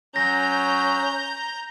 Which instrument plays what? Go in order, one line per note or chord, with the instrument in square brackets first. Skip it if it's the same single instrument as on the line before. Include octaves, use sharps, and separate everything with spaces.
[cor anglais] F#3 [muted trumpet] C#4 [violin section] A#5 G6 [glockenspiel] A#6